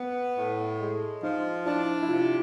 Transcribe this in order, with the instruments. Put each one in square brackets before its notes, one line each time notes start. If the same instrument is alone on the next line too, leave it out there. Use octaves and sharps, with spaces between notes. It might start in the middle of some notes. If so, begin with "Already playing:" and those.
Already playing: [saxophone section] B3
A2
G#3
[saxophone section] F3 [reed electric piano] D#4
[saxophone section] D4 [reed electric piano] E4
[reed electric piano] E4
[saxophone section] C3 [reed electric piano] F4